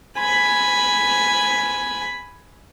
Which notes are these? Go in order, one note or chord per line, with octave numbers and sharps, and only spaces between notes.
G#5 B5